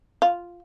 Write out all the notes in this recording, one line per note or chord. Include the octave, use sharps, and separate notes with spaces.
F4